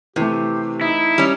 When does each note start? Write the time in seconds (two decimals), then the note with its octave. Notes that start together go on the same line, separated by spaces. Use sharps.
0.16 C3 E3 A3 G4
0.81 D#4 E4
1.18 G3 C#4